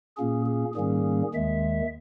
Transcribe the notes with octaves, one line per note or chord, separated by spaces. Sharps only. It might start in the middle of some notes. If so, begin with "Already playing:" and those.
A#2 A#3 C#4 G#4
G#4
G#2 D#3 G3 A#3 C#4 G#4
D#2 D#3 G#3 E5